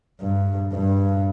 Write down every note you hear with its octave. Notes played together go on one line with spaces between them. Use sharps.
G2
G2